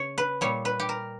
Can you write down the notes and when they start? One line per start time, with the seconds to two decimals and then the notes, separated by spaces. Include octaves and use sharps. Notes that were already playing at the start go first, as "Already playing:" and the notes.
Already playing: C#3 C#5
0.18 B4
0.41 A#2 G3 C#5
0.65 B4
0.80 G4
0.89 A#4